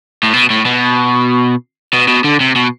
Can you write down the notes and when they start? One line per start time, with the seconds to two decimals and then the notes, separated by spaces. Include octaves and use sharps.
0.23 A2
0.33 B2
0.50 A2
0.66 B2
1.93 B2
2.08 B2
2.24 D3
2.41 C3
2.56 B2